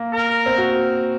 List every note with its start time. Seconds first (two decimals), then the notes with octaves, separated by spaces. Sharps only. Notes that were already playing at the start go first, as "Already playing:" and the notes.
Already playing: A#3
0.13 A#4
0.46 C4
0.58 F#4